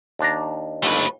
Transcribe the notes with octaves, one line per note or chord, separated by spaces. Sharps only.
D#2 D4 A#5
G1 D#2 A3 B4